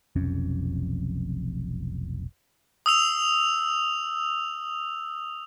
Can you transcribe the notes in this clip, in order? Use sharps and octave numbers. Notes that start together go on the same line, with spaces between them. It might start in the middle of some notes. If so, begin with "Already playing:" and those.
F1 B1 F2 C#4
D#6 E6 F7